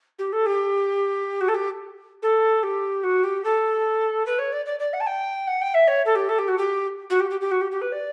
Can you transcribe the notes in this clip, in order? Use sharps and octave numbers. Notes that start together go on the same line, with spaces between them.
G4
A4
G4
F#4
A4
G4
A4
G4
F#4
G4
A4
B4
C#5
D5
D5
D5
F#5
A5
G5
F#5
G5
E5
C#5
A4
G4
A4
G4
F#4
G4
F#4
G4
G4
G4
F#4
G4
G4
B4
D5